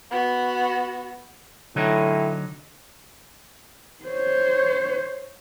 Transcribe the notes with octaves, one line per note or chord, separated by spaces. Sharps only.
B3 F#4
A2 D3 F#3 D#4
C5 C#5